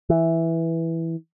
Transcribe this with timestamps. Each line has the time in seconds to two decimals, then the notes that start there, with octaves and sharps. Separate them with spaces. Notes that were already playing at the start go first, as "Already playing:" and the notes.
0.10 E3